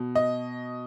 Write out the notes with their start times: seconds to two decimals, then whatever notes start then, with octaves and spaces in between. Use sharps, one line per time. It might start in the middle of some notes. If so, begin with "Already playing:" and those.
Already playing: B2
0.16 D#5